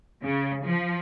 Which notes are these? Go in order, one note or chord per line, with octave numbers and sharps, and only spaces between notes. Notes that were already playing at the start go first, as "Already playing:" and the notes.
C#3
F3